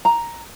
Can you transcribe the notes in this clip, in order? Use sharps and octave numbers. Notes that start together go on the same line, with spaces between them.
A#5